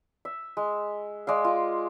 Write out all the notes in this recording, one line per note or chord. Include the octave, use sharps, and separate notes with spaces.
E5
G#3
G#3 D5 F5
F4